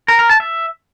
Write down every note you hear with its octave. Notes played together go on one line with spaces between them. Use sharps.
A#4
A#4
A5
E5